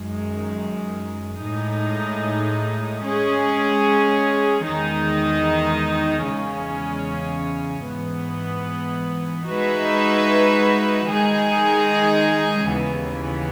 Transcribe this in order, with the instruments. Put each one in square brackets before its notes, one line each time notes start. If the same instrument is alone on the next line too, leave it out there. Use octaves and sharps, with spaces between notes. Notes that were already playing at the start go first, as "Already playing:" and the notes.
Already playing: [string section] F#2 D#3 G#3
A2 G#3 D#4
G#3 C#4 G#4
E2 D#3 G#3 D#4
E2 C#3 G#3 C#4
G#2 E3 B3
G#3 D#4 F#4 B4 E5
D#3 G#3 D#4 G#4
D#2 C#3 E3 B3